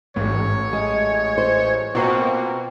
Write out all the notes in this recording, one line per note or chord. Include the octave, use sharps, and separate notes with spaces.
A1 G#2 C#4 C#5
G#3
C5
B2 A#3 C4 F4 F#4 C5